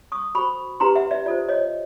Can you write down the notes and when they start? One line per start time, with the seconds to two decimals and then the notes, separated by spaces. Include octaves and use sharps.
0.12 C#6 D#6
0.35 F#4 A4 C5 B5 C#6
0.80 C#4 E4 G4 B4 A#5 C6
0.95 E5 F#5
1.11 D5 E5
1.26 F4 A4 C5 D5
1.48 C#5 D#5